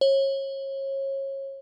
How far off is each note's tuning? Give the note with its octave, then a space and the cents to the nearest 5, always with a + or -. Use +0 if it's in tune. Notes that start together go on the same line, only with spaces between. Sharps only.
C#5 -30